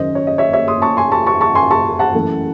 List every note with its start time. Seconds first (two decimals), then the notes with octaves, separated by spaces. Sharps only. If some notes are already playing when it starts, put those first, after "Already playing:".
Already playing: G#1 F#2 C#3 C5 D#5
0.15 C#5
0.27 D#5
0.38 C#5 E5
0.53 C#5 E5
0.68 C6 D#6
0.82 A5 C#6
0.97 G#5 C6
1.12 A5 C#6
1.26 A5 C#6
1.41 A5 C#6
1.55 G#5 C6
1.71 A5 C#6
1.99 F#5 A5
2.14 F#2 E3 A3